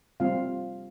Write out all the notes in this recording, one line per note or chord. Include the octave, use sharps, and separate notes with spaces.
G3 C4 F4 F5